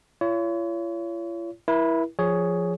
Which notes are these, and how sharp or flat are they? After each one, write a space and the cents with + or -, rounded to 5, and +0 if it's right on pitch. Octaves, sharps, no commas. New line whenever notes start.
F4 -45 C#5 +30
E4 +0 A#4 +45
F3 +0 G#4 +0 C#5 +10